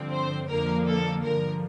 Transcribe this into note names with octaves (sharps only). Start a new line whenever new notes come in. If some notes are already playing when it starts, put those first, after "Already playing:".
Already playing: G2 D3 F3 C4
C5
F2 D3 F3 A#3 A#4
A4
G2 D3 F3 A#4